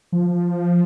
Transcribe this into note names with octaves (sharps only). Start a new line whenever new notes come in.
F3